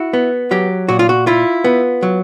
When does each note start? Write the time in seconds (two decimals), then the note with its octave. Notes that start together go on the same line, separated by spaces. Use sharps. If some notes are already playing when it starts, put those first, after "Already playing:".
Already playing: E4 F#4
0.13 B3
0.51 F#3 G4
0.89 A#2 F#4
0.99 F4
1.09 F#4
1.27 E4 F4
1.64 B3
2.03 F#3